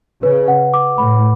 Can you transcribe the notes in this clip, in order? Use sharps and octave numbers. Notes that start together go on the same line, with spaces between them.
C#3 B4
F#5
D6
A2 B5